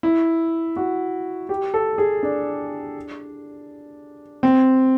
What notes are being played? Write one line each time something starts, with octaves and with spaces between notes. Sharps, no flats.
E4
F#4
G4
A4
G#4
D4
C4